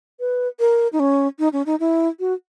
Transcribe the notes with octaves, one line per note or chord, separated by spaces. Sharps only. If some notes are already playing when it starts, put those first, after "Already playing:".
B4
A#4
D#4
C#4
D#4
C#4
D#4
E4
F#4